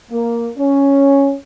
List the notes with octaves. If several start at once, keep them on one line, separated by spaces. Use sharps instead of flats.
A#3
C#4